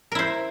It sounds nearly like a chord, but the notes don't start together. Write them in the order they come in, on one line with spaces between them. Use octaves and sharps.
A#4 E4 C5